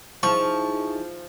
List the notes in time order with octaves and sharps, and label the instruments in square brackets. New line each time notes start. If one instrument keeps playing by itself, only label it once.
[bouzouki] F3 [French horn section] D#4 E4 G#4 [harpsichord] C#6